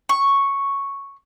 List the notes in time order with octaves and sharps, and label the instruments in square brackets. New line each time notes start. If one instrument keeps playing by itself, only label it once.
[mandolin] C#6